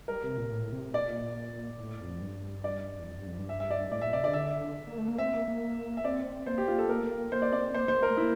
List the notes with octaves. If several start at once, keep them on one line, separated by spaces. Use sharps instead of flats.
G3 A#4
C3
A#2
A2
C3
A#2 D5
A2
F2
G2
D5
E2
F2
G2
F2
G2
E5
E5
D5
A2 D5
A#2 E5
C3 D5
D3 D5
E5
A#3
A3
A#3
C4 E5
A#3
A#3
E5
C4 D5
A#3 C5
G4
A#3 F4
A4
A#3 A#4
A#3
A#3
A#3 C5
D5
C4 D5
A#3 C5
A#3 C5
A#4
A3
A#3 E4